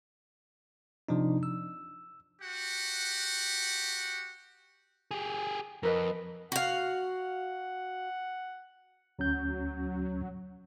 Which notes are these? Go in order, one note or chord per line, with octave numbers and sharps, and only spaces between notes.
C3 F3 D4 D#4
E6
F#4 G4 F#5
G4 G#4
F2 A#4 B4 D#5
F#4 F5 F#5
D2 F#3 C#4 G6